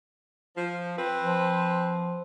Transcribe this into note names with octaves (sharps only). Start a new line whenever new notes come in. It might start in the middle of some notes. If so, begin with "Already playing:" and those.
F3
C4 B4
F3